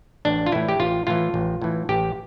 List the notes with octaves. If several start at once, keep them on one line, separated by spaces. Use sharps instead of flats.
A1 D4
F4
A2 E3 E4
G4
A1 F4
A2 E3 F4
A1
A2 E3
A1 G4